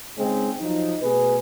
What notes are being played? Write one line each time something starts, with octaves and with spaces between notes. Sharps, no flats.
C#3 G#3 C4 D#4 G#4
F3 F#3 D#4
B2 A3 G#4 B4